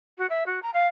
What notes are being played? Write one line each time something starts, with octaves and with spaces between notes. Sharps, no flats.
F#4
E5
F#4
A#5
F5